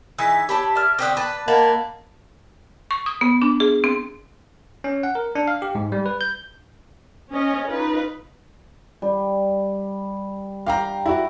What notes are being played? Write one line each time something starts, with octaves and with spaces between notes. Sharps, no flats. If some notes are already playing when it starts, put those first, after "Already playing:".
E3 D#4 E4 G#4 E6 G#6 B6
G4 C#5 A5 B5
D5 E5 F6
D3 C4 F#4 G4 D6 D#6 F#6
B4 A5
A#3 A4 D#5 F#5 B5
C#6
D#6
B3
D4
G#4
C4
C#4
F#5
A#4
D4
F5
G4
G#2
G3
B4
G6
C#4 D#5
D#4 F4 B4
G3
G4 F5 G5 A#5
E4 F#4